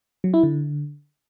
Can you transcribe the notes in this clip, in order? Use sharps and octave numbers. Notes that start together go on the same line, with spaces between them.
F#3
E4
D3